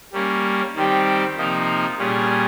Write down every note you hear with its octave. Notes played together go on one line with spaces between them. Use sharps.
G3 A#3 C#4
D#3 G3 C4 G4
C3 F3 A#3 D#4
A#2 G3 C#4 G#4